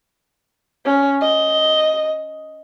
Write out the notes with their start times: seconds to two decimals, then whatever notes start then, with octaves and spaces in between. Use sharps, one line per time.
0.85 C#4
1.21 D#5